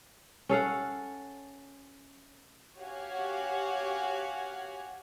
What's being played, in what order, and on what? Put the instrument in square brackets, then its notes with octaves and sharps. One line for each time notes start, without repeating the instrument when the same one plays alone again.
[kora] C#4 A4 F5 F#5
[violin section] F#4 G4 C#5 F5 F#5 G#5